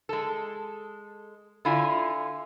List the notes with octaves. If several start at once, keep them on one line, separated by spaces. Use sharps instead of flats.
G#3 A4
D3 E4 F4 E5 G#5